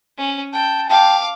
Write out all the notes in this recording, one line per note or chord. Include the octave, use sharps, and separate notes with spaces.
C#4
G5 A5
F5 G5 A5 D6